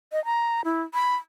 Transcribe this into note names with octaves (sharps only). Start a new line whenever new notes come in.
D#5
A#5
E4
B5